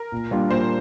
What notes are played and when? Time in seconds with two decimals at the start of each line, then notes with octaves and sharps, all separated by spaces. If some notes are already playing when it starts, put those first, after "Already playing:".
Already playing: A#4
0.12 A#2
0.31 G3 A#3 D4 F4
0.50 A#2 C5